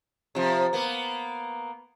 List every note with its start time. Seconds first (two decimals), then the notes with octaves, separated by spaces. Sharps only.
0.35 C3 F3
0.73 A#3 B3